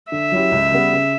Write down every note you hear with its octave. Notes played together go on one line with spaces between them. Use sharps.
D3 E5
F#3 C#4 E4 G4
C#2
C#3 G3 B3
C#3